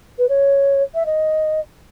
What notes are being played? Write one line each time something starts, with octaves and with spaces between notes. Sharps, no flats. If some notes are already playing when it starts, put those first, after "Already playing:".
B4
C#5
E5
D#5